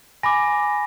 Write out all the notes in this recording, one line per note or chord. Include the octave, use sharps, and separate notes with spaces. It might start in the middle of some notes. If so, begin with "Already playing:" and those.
G#5 B5 D6 A#6